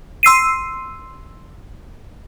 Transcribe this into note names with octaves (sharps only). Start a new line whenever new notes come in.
C6 E6 C7 D#7